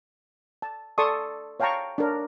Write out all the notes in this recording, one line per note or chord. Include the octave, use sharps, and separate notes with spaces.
A5
A4 D5 A5 C6 C#6 D#6
C#5 F5 G5 A5 A#5 C#6
D4 A#4 C#5